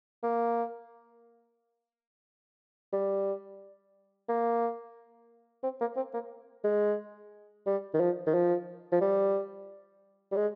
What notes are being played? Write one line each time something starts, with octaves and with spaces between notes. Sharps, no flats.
A#3
G3
A#3
C4
A#3
C4
A#3
G#3
G3
D#3
F3
D#3
F3
F3
G3
G3
G#3